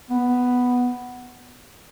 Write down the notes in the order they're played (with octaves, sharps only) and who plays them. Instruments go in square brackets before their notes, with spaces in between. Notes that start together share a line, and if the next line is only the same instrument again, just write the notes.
[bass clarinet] B3